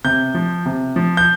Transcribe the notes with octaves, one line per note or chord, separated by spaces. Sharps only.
C3 G6
F3
C3
F3
G6